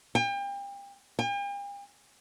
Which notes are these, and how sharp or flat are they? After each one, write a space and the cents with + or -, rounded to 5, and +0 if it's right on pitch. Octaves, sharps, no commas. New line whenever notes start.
G5 +35
G5 +45